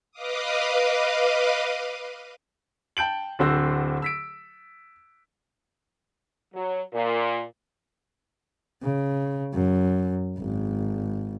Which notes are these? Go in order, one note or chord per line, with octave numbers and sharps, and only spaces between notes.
B4 D#5 F5 D6 D#6
G5 A5 G6 D7 F#7
D1 D3 C4 F#4 C5 E6
E6 B6 D7
F#3
A#2
C#3
F#2
G#1